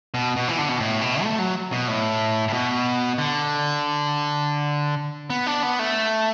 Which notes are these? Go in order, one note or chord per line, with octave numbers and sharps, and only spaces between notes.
B2
B2
E3
D3
B2
A2
B2
A3
F#3
B2
A2
A2
B2
D3
B3
D4
B3
A3